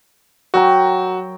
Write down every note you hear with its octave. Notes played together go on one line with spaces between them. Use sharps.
F#3 F#4 G5 A#5